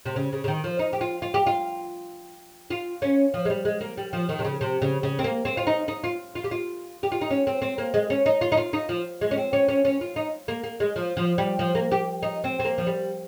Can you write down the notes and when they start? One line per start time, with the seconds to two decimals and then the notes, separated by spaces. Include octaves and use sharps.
0.05 C3
0.16 C#3
0.32 C#3
0.44 C#3
0.48 D#3
0.64 F3
0.79 D#4
0.93 G4
1.01 F4
1.22 F4
1.34 G4
1.46 F4
2.70 F4
3.02 C#4
3.34 F3
3.45 G#3
3.50 G3
3.65 G#3
3.81 A#3
3.97 G3
4.13 F3
4.29 D#3
4.39 C3
4.44 C#3
4.61 C3
4.82 C#3
5.03 C#3
5.19 C4
5.24 A#3
5.45 C4
5.57 F4
5.67 D#4
5.88 D#4
6.04 F4
6.35 F4
6.44 G4
6.51 F4
7.03 G4
7.12 F4
7.21 D#4
7.30 C#4
7.47 C4
7.62 C4
7.78 A#3
7.94 G#3
8.10 C#4
8.26 D#4
8.41 F4
8.52 D#4
8.57 F4
8.73 D#4
8.89 F3
9.21 G#3
9.31 C#4
9.37 C4
9.53 C#4
9.68 C#4
9.85 C#4
10.01 F4
10.16 D#4
10.48 A#3
10.64 A#3
10.80 G#3
10.96 F3
11.17 F3
11.38 G3
11.59 F3
11.75 A#3
11.91 G4
12.23 D#4
12.44 C4
12.60 C4
12.65 A#3
12.78 F3
12.87 G3